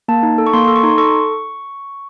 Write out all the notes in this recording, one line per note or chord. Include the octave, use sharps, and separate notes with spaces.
A#3 A5
D#4
A4
C#6
A#3 C6
A4 C6
C#6
D#4 C6
A4 C#6